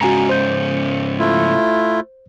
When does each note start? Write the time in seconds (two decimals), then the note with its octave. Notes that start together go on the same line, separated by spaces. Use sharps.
0.01 G#2 C#3 F#4 G#5 A#5
0.29 C5 G6
1.19 A3 E4 F4